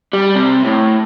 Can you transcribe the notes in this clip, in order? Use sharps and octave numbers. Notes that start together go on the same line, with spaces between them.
G3
C3
A2